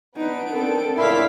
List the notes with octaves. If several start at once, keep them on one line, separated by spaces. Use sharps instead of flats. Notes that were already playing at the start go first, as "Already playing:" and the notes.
B3 D4 D#4 B4 D7
C4 A4 A#4
C#2 A2 D4 E4 D5 F5 C6 B6